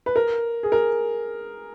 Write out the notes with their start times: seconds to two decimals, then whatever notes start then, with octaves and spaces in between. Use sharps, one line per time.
0.06 B4
0.16 A#4
0.63 G#4
0.72 A#4